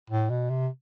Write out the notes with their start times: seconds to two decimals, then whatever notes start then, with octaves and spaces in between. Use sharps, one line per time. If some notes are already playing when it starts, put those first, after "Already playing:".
0.10 A2
0.30 B2
0.50 C3